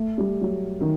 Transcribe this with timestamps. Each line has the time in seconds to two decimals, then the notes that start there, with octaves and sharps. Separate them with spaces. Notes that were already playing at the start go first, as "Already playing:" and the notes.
Already playing: A3
0.18 G3
0.41 F#3
0.81 D#3